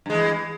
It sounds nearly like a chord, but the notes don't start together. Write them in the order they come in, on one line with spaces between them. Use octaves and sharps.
G2 G#3 E3